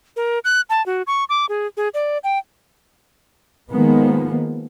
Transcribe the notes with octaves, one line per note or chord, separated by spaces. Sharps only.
A#4
F#6
A5
F#4
C#6
D6
G#4
G#4
D5
G5
D#3 F3 G#3 A#3 B3